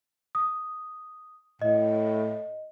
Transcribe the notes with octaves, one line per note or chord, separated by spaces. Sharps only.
D#6
A2 D#5